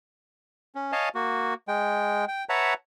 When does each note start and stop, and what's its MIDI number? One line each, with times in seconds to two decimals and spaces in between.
0.75 0.92 61
0.93 1.09 73
0.93 1.09 75
0.93 1.09 77
0.93 1.09 80
0.93 1.09 81
1.15 1.54 58
1.15 1.54 66
1.68 2.25 56
1.68 2.25 79
2.28 2.44 79
2.49 2.74 71
2.49 2.74 73
2.49 2.74 76
2.49 2.74 78
2.49 2.74 81
2.49 2.74 82